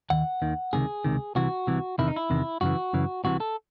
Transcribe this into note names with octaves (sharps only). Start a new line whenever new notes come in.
D#2 D#3 F#5
D#2 D#3
C#2 C3 D#3 G#4
C#2 C3 D#3
C2 C3 E3 F#4
C2 C3 E3
E2 C3 D#3 E4
D#4
E4
E2 C3 D#3
F#2 C#3 E3 F#4
F#2 C#3 E3
C2 C3 E3 F#4
A4